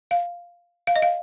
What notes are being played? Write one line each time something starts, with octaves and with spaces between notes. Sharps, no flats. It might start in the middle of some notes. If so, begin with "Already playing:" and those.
F5
F5
D#5
F5